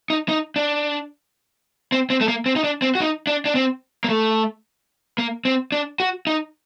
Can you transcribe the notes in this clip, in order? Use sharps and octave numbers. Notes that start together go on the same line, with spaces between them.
D#4
D#4
D4
C4
C4
A3
A#3
C4
D#4
D4
C4
F#4
D#4
D4
D4
C4
A#3
A3
A#3
C4
D4
F#4
D#4